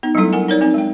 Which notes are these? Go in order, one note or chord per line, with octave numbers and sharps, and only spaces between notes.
B3 D#4
F#3 G3 A3 D4 E4 A4
A#4 F#5 G#5
D#4 A#4 C#5 D5
C4 D#4 G#5
G#3 G5